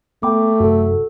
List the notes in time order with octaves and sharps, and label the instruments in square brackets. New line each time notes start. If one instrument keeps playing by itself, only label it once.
[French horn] A3 [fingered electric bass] B3 [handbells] G5 B5 D6
[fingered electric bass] F#2 C3 [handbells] F#4 A4